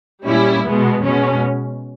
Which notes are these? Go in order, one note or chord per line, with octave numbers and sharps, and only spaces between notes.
A#2 G3 C#4 E4
B2 G#3 B3
B2 G#3 C#4